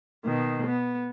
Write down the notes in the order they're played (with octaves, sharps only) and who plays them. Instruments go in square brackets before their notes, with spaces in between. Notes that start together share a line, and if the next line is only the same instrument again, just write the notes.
[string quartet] B2 D#3
B3